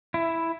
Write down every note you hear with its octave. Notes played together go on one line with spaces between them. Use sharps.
E4